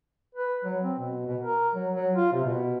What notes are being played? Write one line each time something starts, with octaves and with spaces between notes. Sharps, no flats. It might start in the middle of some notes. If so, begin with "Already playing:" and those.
B4
F#3
C4
B2
B2
A#4
F#3
F#3
F4
C3
B2